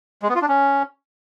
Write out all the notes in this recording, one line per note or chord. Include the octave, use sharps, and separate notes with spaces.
G#3
B3
F4
D4
C#4